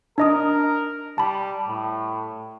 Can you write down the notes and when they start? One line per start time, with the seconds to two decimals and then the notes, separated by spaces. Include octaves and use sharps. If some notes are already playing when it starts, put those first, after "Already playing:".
0.18 D4 A#4 D#5 D#6
1.18 G3 A5 B5
1.68 A2